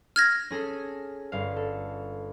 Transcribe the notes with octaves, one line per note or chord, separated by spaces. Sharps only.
F6 G#6 A#6
C#4 G#4 A4
G1 F5
A4